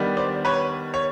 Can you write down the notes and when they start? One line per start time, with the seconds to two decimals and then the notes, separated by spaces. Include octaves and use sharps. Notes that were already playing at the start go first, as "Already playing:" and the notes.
Already playing: D#3 G3 B3 D4
0.17 C5 D5
0.45 B4 C#5
0.94 C#5